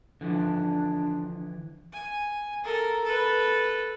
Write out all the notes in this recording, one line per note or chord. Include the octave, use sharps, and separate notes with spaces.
D3 E3 F3 D4
G#5
A4 A#4
A4 B4